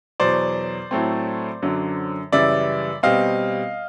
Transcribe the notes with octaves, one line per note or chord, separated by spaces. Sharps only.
E2 B2 F#3 C5 D5
A2 F#3 A3 C4
F#2 D3 F#3
F#2 C#3 E3 G3 D5 E5
B2 G3 C4 D#5 F5